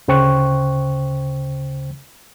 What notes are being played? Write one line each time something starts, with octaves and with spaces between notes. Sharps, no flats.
D2 C#3 C5 G5 C#6 F#6